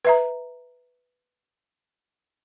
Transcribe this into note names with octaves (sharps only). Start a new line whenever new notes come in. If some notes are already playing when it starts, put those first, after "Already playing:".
B4 E5 A#5